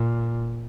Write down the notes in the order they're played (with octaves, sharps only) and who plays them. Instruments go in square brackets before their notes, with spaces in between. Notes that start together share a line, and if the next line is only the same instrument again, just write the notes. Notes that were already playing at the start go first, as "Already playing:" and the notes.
Already playing: [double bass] A#2